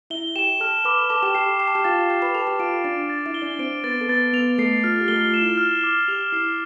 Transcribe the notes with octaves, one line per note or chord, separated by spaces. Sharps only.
E4 E5 G7
G4 G5 E7
A4 A5 F6
B4 B5 D6
B5
A4 A5 D6
G4 G5
G4 G5 C7
G5 C7
A5
G4 G5
F4 F5 A6
G4 G5 A6
B4 B5
A4 A5 F7
G4 G5
F4 F5 D7
D4 D5 A6
A6
E4 E5
G7
D4 D5
C4 C5 D7
B3 B4 A6
A4
B3 B4 A6
B3 B4 F7
A3 A4 C7
F4 F6
G4
A3 A4 G7
F4
E7
E4
F6
D6
G4 F7
E4 C7